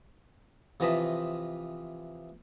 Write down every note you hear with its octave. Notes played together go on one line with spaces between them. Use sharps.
C3 E3 F3 D#5 A5 B5